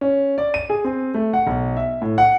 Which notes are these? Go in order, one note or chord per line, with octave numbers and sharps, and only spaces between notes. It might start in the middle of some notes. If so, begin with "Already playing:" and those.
C#4
D5
D#7
G#4
C4
A3
F#5
B1
E5
A2
F#5